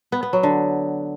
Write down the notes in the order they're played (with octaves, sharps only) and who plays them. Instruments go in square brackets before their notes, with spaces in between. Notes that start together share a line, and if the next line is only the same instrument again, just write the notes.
[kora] B3
B3
F#3
D3